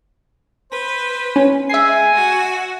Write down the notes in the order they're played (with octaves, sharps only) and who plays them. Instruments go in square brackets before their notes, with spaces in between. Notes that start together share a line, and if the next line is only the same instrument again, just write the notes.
[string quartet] B4 [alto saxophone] C5
[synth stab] C#4
[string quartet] G#3 [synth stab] E5 C7 [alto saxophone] G#5
[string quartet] F#4